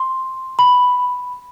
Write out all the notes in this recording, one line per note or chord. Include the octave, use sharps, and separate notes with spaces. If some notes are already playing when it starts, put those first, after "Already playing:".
Already playing: C6
B5